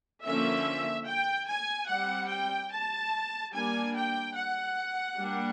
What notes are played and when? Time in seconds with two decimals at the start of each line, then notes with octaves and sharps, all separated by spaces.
0.25 D3 F3 A#3 C#4 E5
1.08 G5
1.49 G#5
1.90 G3 C4 F#5
2.31 G5
2.72 A5
3.54 G3 A#3 D4 G#5
3.96 G5
4.38 F#5
5.19 G3 A#3 D4